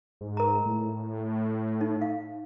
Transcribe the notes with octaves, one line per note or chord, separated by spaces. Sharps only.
G#2
A#4 A#5
A2
D#4
F5